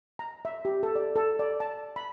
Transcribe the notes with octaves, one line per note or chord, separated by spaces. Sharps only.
A#5
E5
G4
A4
D5
A4
D5
A5
B5